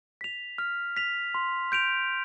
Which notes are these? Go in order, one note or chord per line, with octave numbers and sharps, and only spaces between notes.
B6 F7
F6
B6 F7
C6
G6 D7 F7